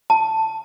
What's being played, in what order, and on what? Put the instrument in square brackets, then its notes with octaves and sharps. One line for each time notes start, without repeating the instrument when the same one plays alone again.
[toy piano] A5